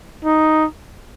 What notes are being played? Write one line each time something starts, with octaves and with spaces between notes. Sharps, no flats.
D#4